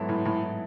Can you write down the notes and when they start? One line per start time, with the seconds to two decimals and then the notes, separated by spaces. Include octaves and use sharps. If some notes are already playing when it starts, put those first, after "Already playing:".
Already playing: G#2 F#3 B3 E4 A4
0.09 A2
0.25 A2